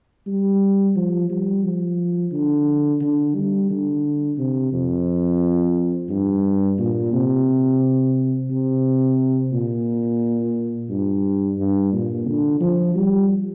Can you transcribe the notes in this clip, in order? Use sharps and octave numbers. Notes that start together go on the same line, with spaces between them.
G3
F3
G3
F3
D3
D3
G3
D3
C3
F2
G2
A#2
C3
C3
A#2
G2
G2
A#2
D3
F3
G3